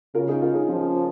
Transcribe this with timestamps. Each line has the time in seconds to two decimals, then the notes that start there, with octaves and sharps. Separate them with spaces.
0.15 C#3 F4 A#4
0.28 D#4 G#4
0.42 F4 A#4
0.55 D#4 G#4
0.68 F3 C#4 F4